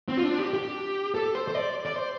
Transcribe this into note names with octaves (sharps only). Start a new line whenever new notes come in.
C4
F4
D4
G4
G4
A4
C5
C5
D5
D5
C5